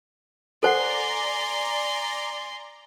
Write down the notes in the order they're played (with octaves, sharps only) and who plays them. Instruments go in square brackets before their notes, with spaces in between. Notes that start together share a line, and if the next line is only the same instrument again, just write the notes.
[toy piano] A4 C5 F#5 [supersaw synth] D5 A#5 [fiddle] G#5 C6